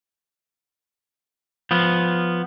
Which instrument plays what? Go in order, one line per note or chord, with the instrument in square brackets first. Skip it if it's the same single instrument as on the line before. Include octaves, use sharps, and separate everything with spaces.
[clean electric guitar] F3 B3